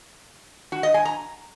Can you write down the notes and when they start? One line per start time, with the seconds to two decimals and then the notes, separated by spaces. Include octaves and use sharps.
0.72 F#4
0.83 D#5
0.94 G#5
1.05 A#5